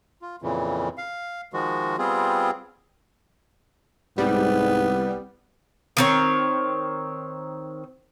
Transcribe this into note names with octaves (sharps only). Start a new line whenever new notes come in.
F4
F2 A#2 C#3 E3
F5
D#3 F3 G#3 F#4
G3 B3 C4 F4 G#4
C2 G#2 G3 B3
D#3 C4 C#5